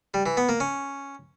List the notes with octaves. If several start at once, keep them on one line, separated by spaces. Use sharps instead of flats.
G3
E3
B3
A#3
C#4